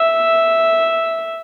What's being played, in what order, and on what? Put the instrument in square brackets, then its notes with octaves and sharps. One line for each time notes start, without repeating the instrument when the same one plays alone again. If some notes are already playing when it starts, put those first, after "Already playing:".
Already playing: [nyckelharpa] E5